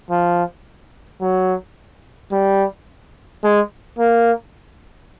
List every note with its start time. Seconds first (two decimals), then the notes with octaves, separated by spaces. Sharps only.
0.10 F3
1.21 F#3
2.32 G3
3.44 G#3
3.99 A#3